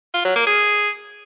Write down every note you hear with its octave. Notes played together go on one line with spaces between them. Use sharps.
F4
F#3
A#3
G#4